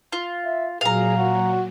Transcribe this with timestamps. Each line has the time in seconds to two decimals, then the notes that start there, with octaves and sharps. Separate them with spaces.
0.13 F4
0.44 E5
0.81 A#2 F#3 G#4 F5 A#5
1.17 F#4